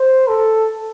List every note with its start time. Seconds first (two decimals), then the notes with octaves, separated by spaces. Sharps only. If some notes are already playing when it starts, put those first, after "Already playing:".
Already playing: C5
0.28 A4